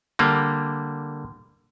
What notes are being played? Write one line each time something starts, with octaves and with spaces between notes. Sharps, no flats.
D3 G3 A#3